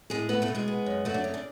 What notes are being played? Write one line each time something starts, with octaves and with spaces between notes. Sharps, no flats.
A2 G#3 G#4
A3 B3 B4
A3 A4
B2
G#3 G#4
B3
F#2
F#3 A3 F#4
D4
C#3 C#4
D4